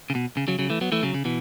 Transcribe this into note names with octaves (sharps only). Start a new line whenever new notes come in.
C#3
B2
C#3
C#3 F#3
C#3 F#3
E3 A3
F#3 B3
E3 A3
C#3 F#3
C#3
B2 E3